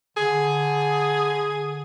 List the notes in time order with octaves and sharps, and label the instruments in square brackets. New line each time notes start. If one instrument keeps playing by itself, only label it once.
[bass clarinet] D3 [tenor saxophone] G#4